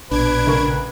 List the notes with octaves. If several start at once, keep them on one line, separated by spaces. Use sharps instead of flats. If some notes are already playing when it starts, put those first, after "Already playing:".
A#1 B2 D4 B4 G#6 D7
C#2 A#4 C#6